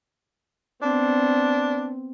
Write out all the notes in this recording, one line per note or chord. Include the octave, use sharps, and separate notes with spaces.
B3 C4 D4